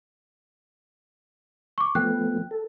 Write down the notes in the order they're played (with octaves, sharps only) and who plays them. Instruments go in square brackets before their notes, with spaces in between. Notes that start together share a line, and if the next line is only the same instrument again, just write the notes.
[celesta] C#6 D6
[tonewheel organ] F3 A3 B3 [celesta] G5 F#6
[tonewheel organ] A4